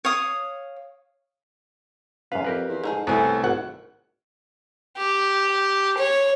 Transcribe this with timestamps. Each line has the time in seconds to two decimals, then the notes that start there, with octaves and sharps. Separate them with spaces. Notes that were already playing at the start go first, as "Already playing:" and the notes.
0.05 C#5 F5 D#6
2.32 C#2 F#2 B4 F5
2.44 F2 G4 A#4 B4
2.69 E2
2.83 G#2 A3 D#4 G#4
3.07 C2 A2 A3 B3 G#4 G#5
3.44 G#1 F#5
4.97 G4
5.97 C#5